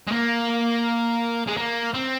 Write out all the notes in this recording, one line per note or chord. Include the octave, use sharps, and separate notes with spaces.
G#3
A#3
G#3
A#3
C4